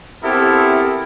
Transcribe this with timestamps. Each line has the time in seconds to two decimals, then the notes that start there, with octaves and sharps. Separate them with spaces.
0.23 B3 C4 E4 G4 A4 A#4